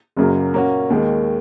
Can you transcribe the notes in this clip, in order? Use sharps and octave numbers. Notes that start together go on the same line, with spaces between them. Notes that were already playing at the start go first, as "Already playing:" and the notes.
F#1 F#2 C#3 F#3 A#3
A#2 A#3 C#4 F#4
D#2 D#3 G#3